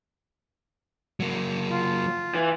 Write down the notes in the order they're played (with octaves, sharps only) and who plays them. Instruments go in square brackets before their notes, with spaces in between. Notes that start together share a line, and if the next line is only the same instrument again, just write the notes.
[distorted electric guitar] F#3 A#3
[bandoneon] F4
[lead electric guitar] E3